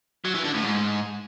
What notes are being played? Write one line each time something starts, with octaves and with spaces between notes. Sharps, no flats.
F#3
E3
D3
A2
G#2